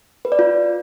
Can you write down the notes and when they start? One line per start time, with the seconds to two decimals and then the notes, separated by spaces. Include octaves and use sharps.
0.25 B4
0.32 D5
0.39 F4